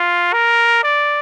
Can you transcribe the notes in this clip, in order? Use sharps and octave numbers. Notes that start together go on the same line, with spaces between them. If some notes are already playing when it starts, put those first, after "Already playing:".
Already playing: F4
A#4
D5